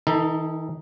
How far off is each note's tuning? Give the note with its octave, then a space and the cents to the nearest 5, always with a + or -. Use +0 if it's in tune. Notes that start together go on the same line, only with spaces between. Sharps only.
E3 -45 D#4 +0 A4 +15